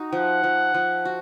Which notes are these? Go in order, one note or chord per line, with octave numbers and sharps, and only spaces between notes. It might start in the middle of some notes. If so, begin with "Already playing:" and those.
Already playing: D#4 F#4
F3 F#5
F3
F3
F#4